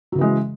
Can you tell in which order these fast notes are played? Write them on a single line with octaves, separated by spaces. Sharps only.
F#3 C#3 E3 G#3